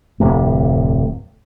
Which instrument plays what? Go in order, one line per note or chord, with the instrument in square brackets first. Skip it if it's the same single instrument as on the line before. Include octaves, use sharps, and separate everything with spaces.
[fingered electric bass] D1 F2 C3 A3